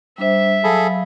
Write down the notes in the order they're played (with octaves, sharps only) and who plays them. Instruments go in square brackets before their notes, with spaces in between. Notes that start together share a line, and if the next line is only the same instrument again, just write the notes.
[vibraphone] G3 D4 C5 [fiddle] E5
[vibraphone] F#3 F5 B5 [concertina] G#4 A4